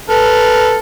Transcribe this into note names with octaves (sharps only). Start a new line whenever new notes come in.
A4 B4 F6